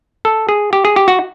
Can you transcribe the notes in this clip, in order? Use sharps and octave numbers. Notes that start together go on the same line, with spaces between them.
A4
G#4
G4
G#4
G4
F#4